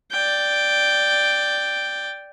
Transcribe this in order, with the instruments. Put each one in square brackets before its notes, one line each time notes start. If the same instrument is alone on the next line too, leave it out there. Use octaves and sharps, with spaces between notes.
[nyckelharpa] D5 G5